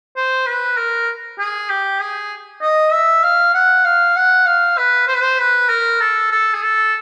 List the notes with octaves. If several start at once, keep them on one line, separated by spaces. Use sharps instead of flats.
C5
B4
A#4
G#4
G4
G#4
D#5
E5
F5
F#5
F5
F#5
F5
B4
C5
B4
C5
B4
A#4
A4
A4
G#4
A4